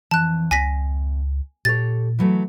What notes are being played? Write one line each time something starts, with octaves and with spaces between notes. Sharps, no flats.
F2 E3 A5 F#6
C#2 G#5 A#6 B6
A#2 G4 A4 C#5 A6
E3 F#3 A3